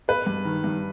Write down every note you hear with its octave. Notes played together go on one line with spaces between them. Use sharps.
B3 B4
G2
D#3
G2